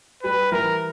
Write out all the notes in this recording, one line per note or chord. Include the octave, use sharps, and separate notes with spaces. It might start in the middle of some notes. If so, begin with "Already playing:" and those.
G3 B4
E3 A#4